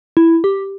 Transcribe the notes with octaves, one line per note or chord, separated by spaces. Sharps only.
E4
G4